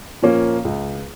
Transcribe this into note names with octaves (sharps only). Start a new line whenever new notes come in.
A#2 F3 A#3 C#4
C#2